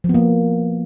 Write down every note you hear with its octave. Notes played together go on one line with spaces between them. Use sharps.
F3
B3
A#3